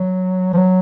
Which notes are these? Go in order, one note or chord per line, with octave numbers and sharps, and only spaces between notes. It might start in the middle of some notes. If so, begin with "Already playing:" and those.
Already playing: F#3
F3
F#3